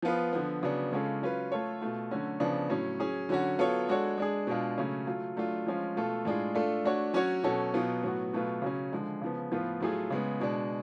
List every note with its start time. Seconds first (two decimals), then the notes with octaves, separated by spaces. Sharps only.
0.02 F3 B3 F4 B4
0.33 D3 F3 B3
0.63 C#3 F#3 B3 D4
0.92 C#3 G#3 C#4 F4 A4
1.22 F#3 C#4 F4 B4
1.52 A3 F4 A4 C#5
1.81 B2 A3 F4
2.11 D3 F#3 A3 C#4 F#4
2.40 C#3 F3 B3 D4
2.70 A2 F#3 C#4
3.00 F#3 C#4 G#4
3.29 D3 F#3 C#4 F#4
3.59 F#3 B3 F4 A4 C#5
3.89 G#3 D4 F#4 A4 C#5
4.18 G#3 D4 G#4
4.47 B2 G#3 D4 F4
4.78 C#3 F#3 A3 C#4
5.07 F#3 A3 F4
5.36 F#3 A3 D4 F4
5.66 F3 G#3 C#4 F4
5.96 B2 A3 F4 A4
6.25 A2 G#3 D4 F4 G#4
6.55 A3 D4 F4 A4
6.85 A3 D4 F#4 C#5
7.14 F#3 C#4 F#4 C#5
7.43 B2 F#3 C#4 F#4 A4
7.74 B2 F#3 B3 F4
8.03 A2 F#3 B3 F#4
8.33 B2 F#3 A3 F4 B4
8.62 C#3 F#3 C#4
8.93 D3 F3 G#3
9.21 C#3 F3 B3
9.52 A2 F3 B3 F4 B4
9.81 A2 F#3 A3 F4 G#4
10.10 C#3 G#3 B3
10.40 B2 G#3 D4